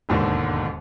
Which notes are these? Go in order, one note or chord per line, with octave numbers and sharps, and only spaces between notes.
E1 D#2 G#2 D3 D#3